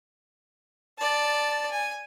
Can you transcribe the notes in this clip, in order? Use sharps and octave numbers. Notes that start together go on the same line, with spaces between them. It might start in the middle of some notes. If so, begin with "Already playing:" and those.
D5 A5
G#5